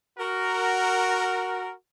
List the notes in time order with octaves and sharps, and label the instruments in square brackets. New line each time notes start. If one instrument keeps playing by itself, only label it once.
[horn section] F#4 A#4